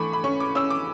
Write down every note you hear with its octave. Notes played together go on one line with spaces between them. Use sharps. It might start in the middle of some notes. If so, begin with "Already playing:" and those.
Already playing: E3 A3 B5 C#6 D6
B5
C#4 C#6
D6
C#4 E6
D6